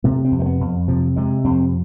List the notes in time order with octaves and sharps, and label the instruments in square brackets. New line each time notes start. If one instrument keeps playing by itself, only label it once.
[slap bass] C3 A3
C4
F2
A3
B3
F2
C3 F3
C3 G#3
F2 C4